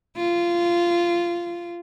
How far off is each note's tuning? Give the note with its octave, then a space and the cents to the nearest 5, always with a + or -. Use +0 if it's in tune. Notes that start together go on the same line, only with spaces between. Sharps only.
F4 -15